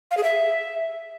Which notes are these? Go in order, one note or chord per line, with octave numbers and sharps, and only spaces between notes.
F5
G#4
E5